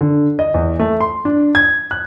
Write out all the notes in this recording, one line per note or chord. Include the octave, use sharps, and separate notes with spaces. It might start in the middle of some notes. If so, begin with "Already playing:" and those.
D3
D#5
E2
A3
C6
D4
G#6
F#6